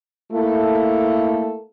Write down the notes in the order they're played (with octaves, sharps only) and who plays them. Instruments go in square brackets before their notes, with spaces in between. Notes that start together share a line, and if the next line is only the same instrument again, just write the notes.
[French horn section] A3 A#3 E4 A4